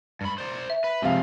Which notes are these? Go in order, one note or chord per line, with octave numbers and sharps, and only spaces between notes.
G2 B5
C5 D5
E5
B4
C3 F3 G#3 F5